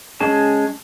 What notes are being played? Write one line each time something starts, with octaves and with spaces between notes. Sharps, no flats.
G#3 C#4 G#4 A5